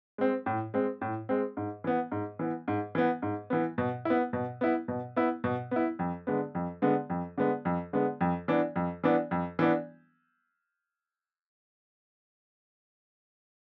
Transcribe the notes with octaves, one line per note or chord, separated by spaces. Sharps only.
G#3 C4
A2
G#3 C4
A2
G#3 C4
G#2
E3 B3
G#2
E3 B3
G#2
E3 B3
G#2
E3 B3
B2
B3 E4
B2
B3 E4
B2
B3 E4
B2
B3 E4
F2
D3 G#3 B3
F2
D3 G#3 B3
F2
D3 G#3 B3
F2
D3 G#3 B3
F2
E3 B3 D4
F2
E3 B3 D4
F2
E3 B3 D4